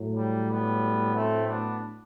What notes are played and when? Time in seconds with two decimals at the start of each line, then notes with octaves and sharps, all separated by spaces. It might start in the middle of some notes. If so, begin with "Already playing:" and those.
Already playing: A2 F#3
0.16 G3
0.49 G3 B3
1.15 A3 C4
1.47 B3 D4